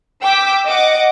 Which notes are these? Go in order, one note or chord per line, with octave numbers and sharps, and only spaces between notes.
G5 D6 E6 B6
D#5 F#5 D6